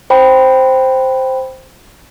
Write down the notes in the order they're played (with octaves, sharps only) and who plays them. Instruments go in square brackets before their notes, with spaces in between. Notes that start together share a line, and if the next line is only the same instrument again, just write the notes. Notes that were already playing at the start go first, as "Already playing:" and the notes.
[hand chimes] C5 G5 B5